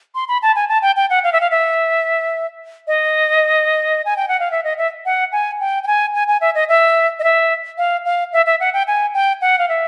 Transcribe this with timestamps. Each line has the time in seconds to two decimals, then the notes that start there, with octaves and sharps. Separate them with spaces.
0.15 C6
0.28 B5
0.42 A5
0.55 G#5
0.69 A5
0.82 G5
0.96 G5
1.10 F#5
1.24 F5
1.33 E5
1.41 F5
1.51 E5
2.87 D#5
4.05 G#5
4.17 G5
4.28 F#5
4.40 F5
4.51 E5
4.64 D#5
4.78 E5
5.05 F#5
5.32 G#5
5.60 G5
5.83 G5
5.87 G#5
6.14 G#5
6.28 G#5
6.41 E5
6.55 D#5
6.69 E5
7.19 D#5
7.24 E5
7.78 F5
8.05 F5
8.33 E5
8.46 E5
8.60 F#5
8.73 G5
8.87 G#5
9.14 G5
9.41 F#5
9.59 F5
9.69 E5